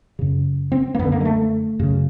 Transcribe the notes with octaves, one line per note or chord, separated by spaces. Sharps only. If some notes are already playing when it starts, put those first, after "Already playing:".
F#2 C#3
C4
A#3
F#2 D3 B3
A#3
G#3
A3
F#2 C#3